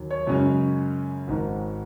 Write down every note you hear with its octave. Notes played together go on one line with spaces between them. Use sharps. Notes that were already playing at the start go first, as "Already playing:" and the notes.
Already playing: D#2 D#3 F#3
C#5
F#2 C#3 G#3 C#4 C#5
G#1 G#2 D#3